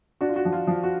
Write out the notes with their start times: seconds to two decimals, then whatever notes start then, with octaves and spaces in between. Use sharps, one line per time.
0.21 D4 F#4
0.29 F4
0.36 F#4
0.45 F3
0.52 F4
0.67 F3
0.83 F#4